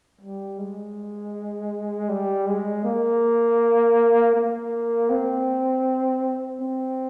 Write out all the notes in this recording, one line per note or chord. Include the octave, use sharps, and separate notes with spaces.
G3
G#3
G3
G#3
A#3
A#3
C4
C4